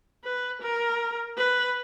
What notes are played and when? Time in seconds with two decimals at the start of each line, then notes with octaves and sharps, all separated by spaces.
0.25 B4
0.62 A#4
1.38 B4